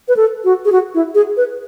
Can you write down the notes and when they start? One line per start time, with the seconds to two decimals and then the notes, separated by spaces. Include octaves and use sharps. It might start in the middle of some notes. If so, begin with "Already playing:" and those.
0.08 B4
0.17 A4
0.44 F#4
0.65 G#4
0.72 F#4
0.94 E4
1.15 G#4
1.37 B4